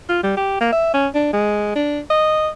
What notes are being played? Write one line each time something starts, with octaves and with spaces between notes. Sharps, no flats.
F4
G3
G4
A#3
E5
C#4
D4
G#3
D4
D#5